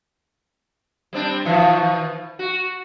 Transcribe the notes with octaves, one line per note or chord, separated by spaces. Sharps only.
G3 C4 D4
B2 D#3 F3
F#4